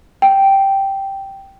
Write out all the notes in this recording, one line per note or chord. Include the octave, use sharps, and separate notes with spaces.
G5